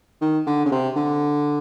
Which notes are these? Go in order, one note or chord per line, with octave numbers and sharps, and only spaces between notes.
D#3
D3
C#3
C3
D3